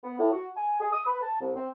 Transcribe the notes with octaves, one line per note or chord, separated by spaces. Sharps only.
B3
A2
F#4
G#5
G#4
D#6
B4
A5
C2
C4